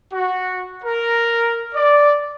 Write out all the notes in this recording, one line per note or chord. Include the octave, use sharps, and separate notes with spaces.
F#4
A#4
D5